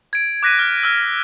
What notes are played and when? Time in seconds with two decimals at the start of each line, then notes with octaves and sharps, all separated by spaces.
0.13 G#6 D7
0.43 D6 F#6 A#6 B6 D#7
0.59 F6
0.83 E6 F6